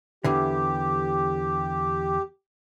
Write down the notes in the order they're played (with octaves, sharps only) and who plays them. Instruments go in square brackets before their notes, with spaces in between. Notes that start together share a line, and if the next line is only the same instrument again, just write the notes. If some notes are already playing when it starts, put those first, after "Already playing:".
[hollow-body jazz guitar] E2 D3 E3 [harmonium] G4